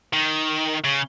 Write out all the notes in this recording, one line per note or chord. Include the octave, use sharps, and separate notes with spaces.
D#3
C#3